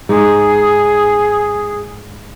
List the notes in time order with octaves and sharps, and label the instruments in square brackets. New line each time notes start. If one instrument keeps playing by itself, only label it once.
[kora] G#2 G#3 D#4 [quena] G#4